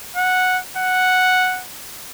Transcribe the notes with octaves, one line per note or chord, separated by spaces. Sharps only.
F#5
F#5